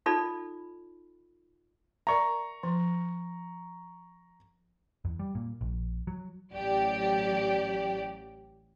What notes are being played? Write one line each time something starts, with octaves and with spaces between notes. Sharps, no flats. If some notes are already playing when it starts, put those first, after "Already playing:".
D#4 F4 A4 D5 B5
A#4 D5 E5 A#5 C#6
F3
E2
G3
A#2
A#1
F#3
A1 F#3 G4 D5